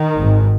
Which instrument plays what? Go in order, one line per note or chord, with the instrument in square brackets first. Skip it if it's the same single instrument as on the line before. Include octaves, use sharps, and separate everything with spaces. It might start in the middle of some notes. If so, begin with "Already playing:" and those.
Already playing: [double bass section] D#3
G#1 G#2